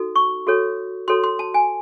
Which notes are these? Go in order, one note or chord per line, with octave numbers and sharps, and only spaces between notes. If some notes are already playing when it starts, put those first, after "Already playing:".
Already playing: D#4 F#4 A4
C#6
F#4 A4 C#5
F#4 A4 C#5 C6
C6
A5
G#5